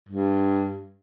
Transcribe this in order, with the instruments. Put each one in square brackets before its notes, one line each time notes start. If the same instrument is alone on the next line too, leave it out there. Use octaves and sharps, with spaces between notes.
[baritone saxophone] G2